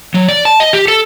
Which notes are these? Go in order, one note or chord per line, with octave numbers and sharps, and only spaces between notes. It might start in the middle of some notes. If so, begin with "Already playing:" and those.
F#3
D5
A5
D#5
G4
A4